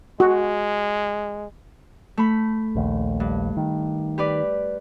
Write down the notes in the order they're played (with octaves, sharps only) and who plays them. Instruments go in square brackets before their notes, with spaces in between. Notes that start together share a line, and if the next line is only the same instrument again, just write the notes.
[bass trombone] G#3 [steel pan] F#4
[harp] A3 B5
[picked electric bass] A#1 D#2
[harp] G2
[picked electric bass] D#3
[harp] G4 B4 D5